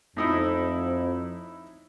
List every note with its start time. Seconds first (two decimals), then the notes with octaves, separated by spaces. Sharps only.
0.17 F2 A2 D#4 E4